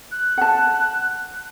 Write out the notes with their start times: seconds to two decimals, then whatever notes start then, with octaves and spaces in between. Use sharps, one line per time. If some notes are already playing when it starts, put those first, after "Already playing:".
0.11 F#6
0.37 F#5 A5